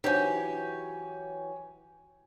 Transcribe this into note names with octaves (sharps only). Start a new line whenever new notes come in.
E3 F#3 D4 D#4 G4 C5 C#5 G#5